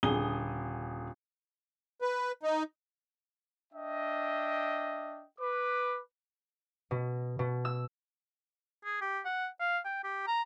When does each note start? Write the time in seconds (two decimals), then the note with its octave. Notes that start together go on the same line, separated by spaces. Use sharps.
0.03 D#1 D3 G#4 D#6 G7
2.02 B4
2.43 D#4
3.73 D4 D#5 E5 G5
5.41 B4 D6
6.91 B2
7.39 B2
7.65 E6
8.85 G#4
9.01 G4
9.25 F#5
9.60 F5
9.85 G5
10.04 G4
10.27 A#5